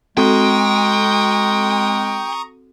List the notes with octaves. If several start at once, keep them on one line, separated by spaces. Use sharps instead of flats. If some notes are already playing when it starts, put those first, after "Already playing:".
G#3 C4 F#4 A4 G5 A#5 C#6 D#6